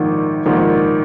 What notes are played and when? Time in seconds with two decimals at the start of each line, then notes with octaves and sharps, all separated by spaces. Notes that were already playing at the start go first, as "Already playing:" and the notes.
Already playing: A#1 G#2 D#3
0.45 A#1 G#2 D#3